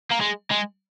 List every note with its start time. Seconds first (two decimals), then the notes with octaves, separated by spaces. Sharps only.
0.11 A#3
0.20 G#3
0.51 G#3